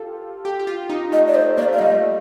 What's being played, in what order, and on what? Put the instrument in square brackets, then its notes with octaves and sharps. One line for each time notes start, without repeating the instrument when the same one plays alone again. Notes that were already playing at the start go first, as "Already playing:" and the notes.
Already playing: [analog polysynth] F4 G4 A4
G4
G4
F4
D#4
[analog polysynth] A3 [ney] D#5
[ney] D5
[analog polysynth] A3 [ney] C5
[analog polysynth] A#3 [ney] D5
[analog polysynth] A3
[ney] F5
[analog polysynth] G3 [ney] D#5
[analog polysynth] A3